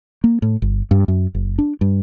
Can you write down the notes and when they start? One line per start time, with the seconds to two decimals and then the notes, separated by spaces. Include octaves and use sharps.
0.24 A#3
0.42 A2
0.62 G1
0.91 G2
1.08 F#2
1.35 F#1
1.58 D4
1.81 G2